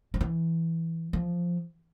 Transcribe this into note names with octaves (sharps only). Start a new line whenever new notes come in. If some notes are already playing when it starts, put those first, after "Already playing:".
F3
E3
F3